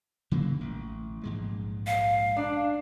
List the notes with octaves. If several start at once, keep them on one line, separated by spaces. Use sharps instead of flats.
C#3 F#3 A#3
A1
A#1 G#2 G#3
F5
D4